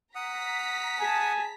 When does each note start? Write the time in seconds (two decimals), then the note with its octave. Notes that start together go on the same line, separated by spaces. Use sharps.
0.15 F#5 A#5 D#6 B6
1.00 G#4 G#5 A5